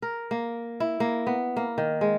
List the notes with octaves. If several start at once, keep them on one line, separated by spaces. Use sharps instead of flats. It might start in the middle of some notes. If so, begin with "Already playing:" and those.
A#4
A#3
E4
A#3
B3
A#3
D#3
G#3